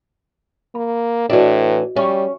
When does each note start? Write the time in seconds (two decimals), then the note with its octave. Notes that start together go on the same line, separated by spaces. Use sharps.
0.75 A#3 B5
1.30 A2 E3 D4 F#4 B4 D#5
1.96 G3 C#4 E5 C#6